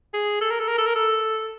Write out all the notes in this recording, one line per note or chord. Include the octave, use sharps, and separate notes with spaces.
G#4
A4
A#4
A4
A#4
A4
A#4
A4